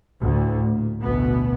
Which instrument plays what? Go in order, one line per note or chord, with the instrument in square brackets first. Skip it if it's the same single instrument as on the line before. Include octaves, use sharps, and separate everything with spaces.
[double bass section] D2 A2
A#2
A1 D2 B2 B3